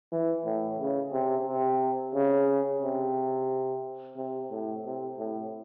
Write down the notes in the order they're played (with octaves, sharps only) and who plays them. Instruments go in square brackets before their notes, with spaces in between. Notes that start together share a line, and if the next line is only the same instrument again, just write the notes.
[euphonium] E3
A2
C#3
C3
C3
C#3
C3
C3
A2
C3
A2